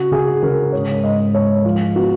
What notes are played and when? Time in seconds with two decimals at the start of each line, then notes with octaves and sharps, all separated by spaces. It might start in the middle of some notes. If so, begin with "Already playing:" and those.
Already playing: C#3 F#4
0.12 C#3 G#4
0.43 C#3 A#4
0.72 G#2 C#5
1.03 G#2 D#5
1.34 G#2 C#5
1.65 F3 F4
1.95 B3 F#4